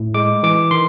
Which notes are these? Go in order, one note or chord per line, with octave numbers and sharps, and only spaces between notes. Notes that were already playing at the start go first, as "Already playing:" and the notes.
Already playing: A2
G#3 D6
E3 D6
D#3 C6